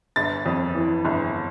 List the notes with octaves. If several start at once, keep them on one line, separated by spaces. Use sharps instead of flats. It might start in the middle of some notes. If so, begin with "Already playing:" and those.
G1 A6
F2
E3
G1